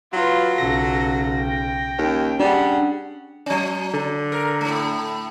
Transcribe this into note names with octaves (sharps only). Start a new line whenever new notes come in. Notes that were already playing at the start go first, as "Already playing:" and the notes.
F#3 F4 B4
B1 C#3 A4 A#6
G5
D#2 C#4
G3 D4 G#4 F#5
F#3 C#4
D3
A#4
A2 A3